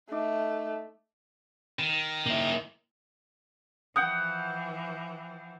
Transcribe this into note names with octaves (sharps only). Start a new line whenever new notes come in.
A3 D#4 D#5 D6
D#3
A#3 E4
E3 F3 F#5 G5 D#6